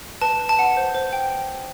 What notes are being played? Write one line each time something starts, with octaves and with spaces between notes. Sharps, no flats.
B4 A5
B4
A5
F#5
C5
C5
G5